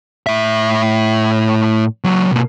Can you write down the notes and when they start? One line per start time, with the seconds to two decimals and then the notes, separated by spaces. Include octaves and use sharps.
0.27 A2 E5
2.04 C#2 F#3
2.31 B2 A#3